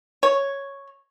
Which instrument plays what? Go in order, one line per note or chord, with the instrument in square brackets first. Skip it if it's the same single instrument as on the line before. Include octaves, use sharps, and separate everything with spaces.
[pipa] C#5